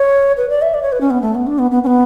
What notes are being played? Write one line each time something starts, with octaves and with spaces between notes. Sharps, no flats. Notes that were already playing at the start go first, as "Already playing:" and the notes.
Already playing: C#5
B4
D5
E5
D5
C#5
B4
C#4
B3
A3
B3
D4
B3
B3
C#4
B3